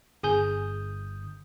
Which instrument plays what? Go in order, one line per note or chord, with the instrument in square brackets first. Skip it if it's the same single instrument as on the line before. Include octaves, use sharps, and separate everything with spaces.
[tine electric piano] G1 D#6 G6 [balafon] G#4 G#5